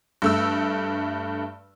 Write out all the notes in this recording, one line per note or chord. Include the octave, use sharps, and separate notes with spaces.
G2 A3 E6